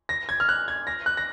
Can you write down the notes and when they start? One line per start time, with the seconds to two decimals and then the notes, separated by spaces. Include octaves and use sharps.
0.09 A#6
0.29 G#6
0.40 F6
0.49 F#6
0.68 G#6
0.87 A#6
1.06 F#6
1.17 A#6